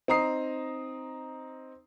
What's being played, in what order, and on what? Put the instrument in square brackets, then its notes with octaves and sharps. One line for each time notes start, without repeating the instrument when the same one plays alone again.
[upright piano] C4 D#4 A#5 D#6 C7